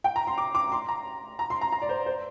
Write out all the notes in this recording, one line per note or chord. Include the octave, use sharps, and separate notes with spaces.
G5
A#5
C6
D6
D6
C6
A#5
A#5
C6
A#5
A#5
D5
C5
C5